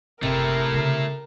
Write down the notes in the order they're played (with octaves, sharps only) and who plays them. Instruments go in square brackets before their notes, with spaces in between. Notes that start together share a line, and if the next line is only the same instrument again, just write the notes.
[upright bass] F#1 [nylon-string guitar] C3 [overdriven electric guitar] A3 E4 [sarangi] A#4
[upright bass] C#3 B3